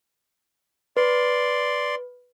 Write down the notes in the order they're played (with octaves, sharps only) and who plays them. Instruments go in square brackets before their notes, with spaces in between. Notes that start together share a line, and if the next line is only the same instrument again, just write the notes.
[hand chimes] B4 [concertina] D5 C6